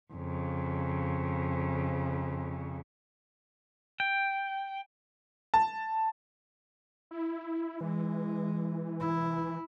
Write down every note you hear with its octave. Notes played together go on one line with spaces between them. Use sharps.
F2 C#3
G5
A5
E4
E3 G#3
E4